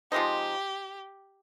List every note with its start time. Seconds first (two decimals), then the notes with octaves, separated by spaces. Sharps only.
0.12 F3 G#3 C4 D#4 G4